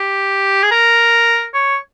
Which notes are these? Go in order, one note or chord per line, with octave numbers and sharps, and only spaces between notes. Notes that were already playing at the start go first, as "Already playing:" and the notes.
Already playing: G4
G#4
A#4
C#5